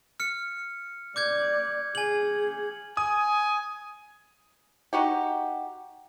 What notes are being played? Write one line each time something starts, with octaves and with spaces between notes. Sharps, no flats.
F6 C#7
D5 D6 G6 G#6
G#4 G#5 F#7
G#5 D#6
D#4 F#4 G4